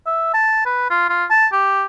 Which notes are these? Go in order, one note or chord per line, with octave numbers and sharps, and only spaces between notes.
E5
A5
B4
F4
F4
A5
G4